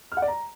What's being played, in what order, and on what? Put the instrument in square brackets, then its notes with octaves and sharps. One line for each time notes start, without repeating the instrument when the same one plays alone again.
[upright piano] F6
F#5
D5
A#5